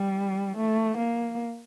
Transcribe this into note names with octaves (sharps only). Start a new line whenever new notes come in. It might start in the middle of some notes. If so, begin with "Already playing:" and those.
Already playing: G3
A3
A#3